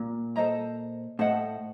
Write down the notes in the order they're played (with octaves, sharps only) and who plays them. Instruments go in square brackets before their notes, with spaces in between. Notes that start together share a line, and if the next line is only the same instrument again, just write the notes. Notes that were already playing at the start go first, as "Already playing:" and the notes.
Already playing: [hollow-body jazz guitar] A#2
[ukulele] A4 C5 D#5 A#5
[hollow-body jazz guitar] A2 [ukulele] A4 C5 D#5 F#5